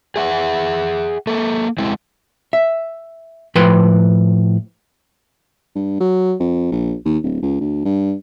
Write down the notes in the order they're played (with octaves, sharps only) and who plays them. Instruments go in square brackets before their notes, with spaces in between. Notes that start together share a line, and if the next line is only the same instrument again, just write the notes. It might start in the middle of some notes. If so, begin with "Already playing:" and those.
[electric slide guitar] G#4 E5 F#5
A#3 A4
G#3 C4 E4
[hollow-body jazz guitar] E5
A2 F3 B4 G5 B5 C6
[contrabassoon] G2
F#3
F2
A#1
D#2
D1
C#2
D2
G2